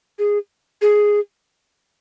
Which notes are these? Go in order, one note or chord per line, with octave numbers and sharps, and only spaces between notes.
G#4
G#4